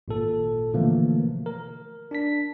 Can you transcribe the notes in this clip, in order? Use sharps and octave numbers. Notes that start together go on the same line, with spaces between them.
G#1 A#2 A4
B2 D3 E3 F3 A3 A#3
A#4
D4 A5 B6